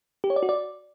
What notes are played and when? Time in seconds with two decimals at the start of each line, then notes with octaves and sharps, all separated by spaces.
0.24 G4
0.30 C#5
0.36 D5
0.43 F#4
0.49 D5